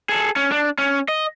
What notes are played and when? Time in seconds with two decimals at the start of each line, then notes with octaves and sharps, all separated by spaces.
0.09 G#4 A4
0.36 C#4
0.51 D4
0.78 C#4
1.08 D#5